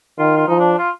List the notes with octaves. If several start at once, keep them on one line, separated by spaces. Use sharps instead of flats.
D#3 F4
F4
F3 D#4
D4
F4